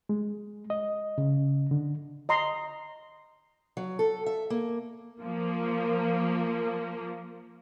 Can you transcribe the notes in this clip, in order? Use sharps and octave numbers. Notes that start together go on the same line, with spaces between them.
G#3
D#5
C#3
D3
D#5 A#5 C6 D#6
F#3
A4
E5
A#3
F3 A#3